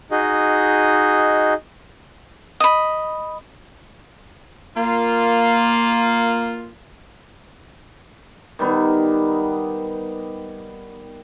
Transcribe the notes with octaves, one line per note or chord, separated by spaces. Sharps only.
D#4 F#4 G#4 D#5
D#5 B5
A#3 F4
D#3 G3 B3